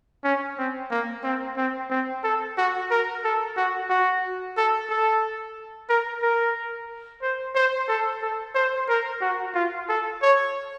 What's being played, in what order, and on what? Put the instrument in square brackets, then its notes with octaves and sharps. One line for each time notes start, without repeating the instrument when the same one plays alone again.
[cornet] C#4
C4
A#3
C4
C4
C4
A4
F#4
A#4
A4
F#4
F#4
A4
A4
A#4
A#4
C5
C5
A4
A4
C5
A#4
F#4
F4
A4
C#5